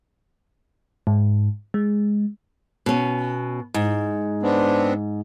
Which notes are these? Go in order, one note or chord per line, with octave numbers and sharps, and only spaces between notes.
G#2
G#3
B2 C#4
G#2
B3 C4 D4